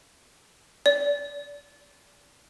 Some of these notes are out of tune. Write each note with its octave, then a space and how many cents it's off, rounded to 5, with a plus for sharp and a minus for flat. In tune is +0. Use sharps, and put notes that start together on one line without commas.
D5 -30